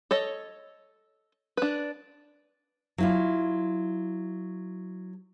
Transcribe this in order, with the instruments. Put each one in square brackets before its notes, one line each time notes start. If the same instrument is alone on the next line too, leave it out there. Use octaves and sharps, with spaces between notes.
[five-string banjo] A4 C#5 D#5
D4 B4
[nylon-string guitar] F#3 E4 F4